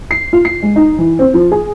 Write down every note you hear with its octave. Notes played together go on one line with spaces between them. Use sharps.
C7
F4
C7
G#3
D#4
E3
C4
F3
G#4